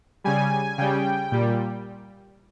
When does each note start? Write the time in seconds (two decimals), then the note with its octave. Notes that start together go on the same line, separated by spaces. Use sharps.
0.24 C#3 G3 G#5
0.78 C#3 G3 G5
1.32 A#2 G3